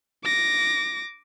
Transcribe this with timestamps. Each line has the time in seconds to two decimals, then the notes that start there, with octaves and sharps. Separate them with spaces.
0.24 D6 A#6